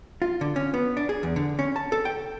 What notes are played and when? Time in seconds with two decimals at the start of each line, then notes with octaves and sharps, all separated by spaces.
0.22 F4
0.41 D3
0.56 C#4
0.74 B3
0.97 D4
1.09 G#4
1.23 E2
1.36 D3
1.59 C#4
1.76 A5
1.92 A4
2.05 G5